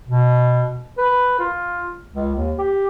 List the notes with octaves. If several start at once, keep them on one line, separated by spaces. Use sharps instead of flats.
B2
B4
F4
C#2
D#2
G4